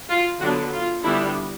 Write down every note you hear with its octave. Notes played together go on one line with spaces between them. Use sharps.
F4
D3 F#3 B3 D4 F#4
F4
D3 G3 B3 D4 E4